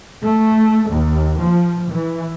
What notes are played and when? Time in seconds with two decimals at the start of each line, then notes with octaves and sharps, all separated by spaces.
0.24 A3
0.90 D#2
1.41 F3
1.91 E3